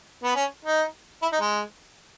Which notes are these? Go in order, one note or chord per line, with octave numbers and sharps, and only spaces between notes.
B3
C#4
D#4
E4
D#4
G#3